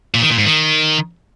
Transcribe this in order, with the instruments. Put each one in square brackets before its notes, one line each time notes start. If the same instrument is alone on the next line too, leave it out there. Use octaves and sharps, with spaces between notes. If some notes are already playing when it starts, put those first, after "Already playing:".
[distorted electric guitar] A#2
D#3
A#2
G#2
D#3